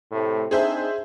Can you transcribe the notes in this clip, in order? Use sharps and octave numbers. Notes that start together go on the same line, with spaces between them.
A2 C3 A3
C4 D4 D#4 G#4 C5 E5